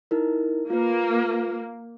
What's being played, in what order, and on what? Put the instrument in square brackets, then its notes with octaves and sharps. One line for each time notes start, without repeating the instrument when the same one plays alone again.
[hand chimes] D#4 E4 A#4
[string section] A#3 [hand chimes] F4 B4